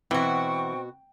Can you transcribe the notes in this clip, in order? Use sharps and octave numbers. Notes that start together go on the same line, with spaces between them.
B2 E3 C4 F#4 G5 C#6